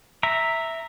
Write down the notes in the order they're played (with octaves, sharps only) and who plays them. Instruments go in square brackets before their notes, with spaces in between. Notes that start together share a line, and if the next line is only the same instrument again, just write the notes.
[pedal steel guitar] E5 A#5